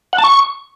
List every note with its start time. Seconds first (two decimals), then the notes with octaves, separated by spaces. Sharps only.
0.13 F#5
0.18 A5
0.24 C#6